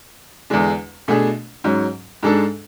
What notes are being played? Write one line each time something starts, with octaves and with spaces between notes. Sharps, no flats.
E2 D3 G#3 D4
B2 A3 D4 G#4
G#2 F#3 C#4
G#2 G#3 D4 A4